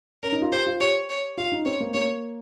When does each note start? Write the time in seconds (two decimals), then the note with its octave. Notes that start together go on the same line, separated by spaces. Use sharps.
0.23 C#4 A#4
0.32 D#4
0.42 F4
0.52 G4 C5
0.67 F4
0.80 G4 C#5
1.09 C#5
1.38 F4 F5
1.52 D#4
1.65 C4 C#5
1.81 A#3
1.94 A#3 C#5